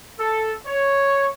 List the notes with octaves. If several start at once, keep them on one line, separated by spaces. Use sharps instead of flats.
A4
C#5